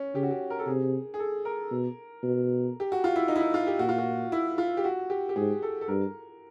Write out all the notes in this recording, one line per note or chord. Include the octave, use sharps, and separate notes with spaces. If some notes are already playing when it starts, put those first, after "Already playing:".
Already playing: C#4
C#3 G4
F#4
G4
A#4
A4
C3 G#4
G#4
A4
A#4
B2
B2
G4
F#4
F4
E4
D#4
E4
D#4
F4
G4
A#2 F#4
F4
F#4
E4
F4
G4
F#4
G4
G4
G#2 G#4
A4
A4
G2 A#4